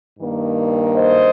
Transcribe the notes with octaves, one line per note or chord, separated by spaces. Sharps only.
G2 D#3 A#3
C5 D#5